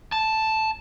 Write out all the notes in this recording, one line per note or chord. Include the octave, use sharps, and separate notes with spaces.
A5